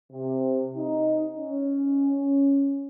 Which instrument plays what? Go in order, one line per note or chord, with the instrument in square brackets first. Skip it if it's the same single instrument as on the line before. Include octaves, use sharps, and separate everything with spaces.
[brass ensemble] C3
D#4
C#4